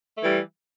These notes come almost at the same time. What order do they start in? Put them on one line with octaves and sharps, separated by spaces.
A3 E3 G3